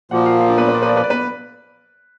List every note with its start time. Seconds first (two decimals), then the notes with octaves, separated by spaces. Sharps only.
0.11 A#2 F3 A#3 F#4 F#5
0.26 F4 F5
0.39 F4 F5
0.48 D4 D5
0.58 B3 B4
0.68 B4
0.75 D5
0.83 B4
0.89 D5
0.97 B4
1.04 D5
1.10 B3 B4